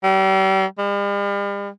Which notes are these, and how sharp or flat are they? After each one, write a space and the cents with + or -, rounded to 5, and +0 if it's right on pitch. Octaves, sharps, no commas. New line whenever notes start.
G3 -35
G3 +45